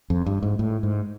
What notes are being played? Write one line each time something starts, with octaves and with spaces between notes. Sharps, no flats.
F2
G2
G#2
A2
G#2